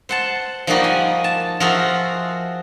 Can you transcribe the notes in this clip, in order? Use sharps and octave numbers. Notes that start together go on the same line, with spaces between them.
C5 F#5 A5
F3 G3 A#3 D#4 F#4 G4
G#5
A5
F3 F4 F#4 G#4 A#4 E5